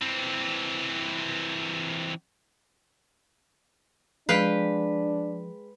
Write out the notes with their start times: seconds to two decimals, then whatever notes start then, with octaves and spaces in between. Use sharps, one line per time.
0.01 E3 C4
4.29 F3 G#3 D4 B4 F5 G5